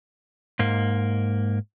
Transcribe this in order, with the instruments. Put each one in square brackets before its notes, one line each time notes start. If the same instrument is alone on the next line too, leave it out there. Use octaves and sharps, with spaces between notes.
[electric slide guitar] G#2 A#3